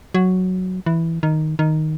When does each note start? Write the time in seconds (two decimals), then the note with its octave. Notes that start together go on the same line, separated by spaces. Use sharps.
0.14 F#3
0.86 E3
1.23 D#3
1.59 D#3